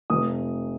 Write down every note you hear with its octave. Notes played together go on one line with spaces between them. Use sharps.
F1 D#6